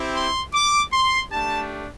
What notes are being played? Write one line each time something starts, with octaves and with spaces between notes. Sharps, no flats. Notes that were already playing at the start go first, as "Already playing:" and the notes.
Already playing: C4 E4 G4
C6
D6
C6
A3 D4 G4 A5